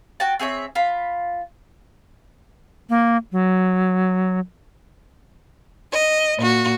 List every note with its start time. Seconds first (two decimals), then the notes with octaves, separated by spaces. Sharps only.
0.20 F#4 G5 A5
0.39 C4 G#4 C#5 E5
0.75 F4 B5
2.90 A#3
3.32 F#3
5.92 D#5
6.38 A#2 F#4